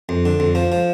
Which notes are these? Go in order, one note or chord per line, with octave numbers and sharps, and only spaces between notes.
F2
D3
F2
F3
F3